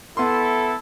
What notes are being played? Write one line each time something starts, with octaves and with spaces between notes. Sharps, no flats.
B3 E4 A4 C6